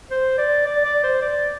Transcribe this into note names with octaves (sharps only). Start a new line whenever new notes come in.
C5
D5
D5
D5
C5
D5